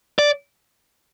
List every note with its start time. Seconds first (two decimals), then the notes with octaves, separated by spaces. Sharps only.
0.19 D5